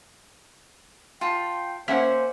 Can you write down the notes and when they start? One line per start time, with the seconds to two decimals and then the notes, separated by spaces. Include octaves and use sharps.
1.21 F4 G5 A5
1.88 A#3 C#4 C5 E5 F#5